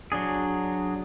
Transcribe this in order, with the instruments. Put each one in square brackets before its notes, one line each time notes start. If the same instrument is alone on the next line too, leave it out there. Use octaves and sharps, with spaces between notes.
[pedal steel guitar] F#3 D4 G#4